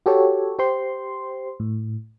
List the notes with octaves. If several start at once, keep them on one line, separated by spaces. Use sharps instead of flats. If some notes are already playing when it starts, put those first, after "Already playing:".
F#4 G4 A4 C#5
G4 C5 C6
A2